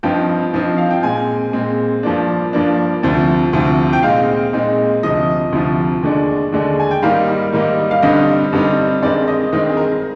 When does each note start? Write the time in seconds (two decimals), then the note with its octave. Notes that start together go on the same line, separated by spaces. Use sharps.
0.03 G2 F3 C4 D#4 G5
0.53 G2 F3 C4 D#4
0.78 F5
0.91 G5
1.03 A#2 G#3 C4 G#5
1.53 A#2 G#3 C4
2.03 G2 F3 A#3 D4
2.53 G2 F3 A#3 D4
3.03 D2 C3 F3 C4
3.53 D2 C3 F3 C4
3.93 G5
4.03 A#2 G#3 C4 D#4 F5
4.53 A#2 G#3 C4 D#4
5.03 D2 C3 F3 D#5
5.52 D2 C3 F3
6.03 D#2 D3 G#3 D4
6.52 D#2 D3 G#3 D4
6.80 G#5
6.91 G5
7.02 G#2 D#3 G3 A#3 D#4 F5
7.53 G#2 D#3 G3 A#3 D#4
7.91 F5
8.02 G2 D3 G3 C4 D#4 D#5
8.52 G2 D3 G3 C4 D#4
9.03 G2 D#3 G#3 C4 D5
9.28 D#5
9.52 G2 D#3 G#3 C4 D#5
9.70 G#4
9.77 A#4